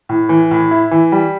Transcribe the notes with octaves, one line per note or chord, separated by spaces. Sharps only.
A2
E3
A2
E4
E3
G3